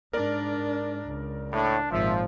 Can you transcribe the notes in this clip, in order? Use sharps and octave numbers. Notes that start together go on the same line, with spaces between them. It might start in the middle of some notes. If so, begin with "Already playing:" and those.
G#2 D4 A#4 D5
C#2
A2 D4
G#1 A#2 F3 E5